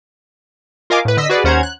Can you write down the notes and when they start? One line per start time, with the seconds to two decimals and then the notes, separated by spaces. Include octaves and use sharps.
0.90 F4 A#4 D#5 F5 G#5 D6
1.05 A2 B4
1.17 D3 D#5 E6 B6
1.29 F#4 G#4 B4 D5
1.44 D#2 C#4 C5 F#5 A#5 G#6
1.63 F#6